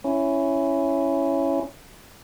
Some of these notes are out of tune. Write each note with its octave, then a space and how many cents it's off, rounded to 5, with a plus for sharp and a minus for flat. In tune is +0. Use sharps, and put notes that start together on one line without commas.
C#4 +0 E4 +10